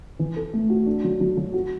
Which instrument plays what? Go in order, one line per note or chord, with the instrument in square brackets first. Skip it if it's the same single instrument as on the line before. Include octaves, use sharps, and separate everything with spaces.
[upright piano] E3
A4
A3
F#4
D4
F#3
F#3
F#3
F#4